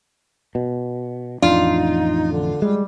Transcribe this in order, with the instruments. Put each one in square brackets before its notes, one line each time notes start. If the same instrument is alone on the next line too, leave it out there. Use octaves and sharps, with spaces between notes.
[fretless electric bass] B2
[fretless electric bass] A1 F2 D4 [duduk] D#4 [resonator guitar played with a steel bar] F4
[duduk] D3
[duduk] G3 [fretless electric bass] G#3